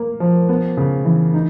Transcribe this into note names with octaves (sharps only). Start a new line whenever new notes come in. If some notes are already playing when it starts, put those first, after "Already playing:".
Already playing: A#3
F3
B3
C#3
E3
D#4